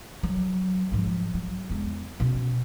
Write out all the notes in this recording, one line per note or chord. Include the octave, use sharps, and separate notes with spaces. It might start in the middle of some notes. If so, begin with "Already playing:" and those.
F#3
G#2 F3
F#3
E2 G#3
B2 C#4